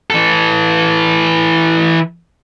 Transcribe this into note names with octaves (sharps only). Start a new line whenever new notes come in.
E3 A4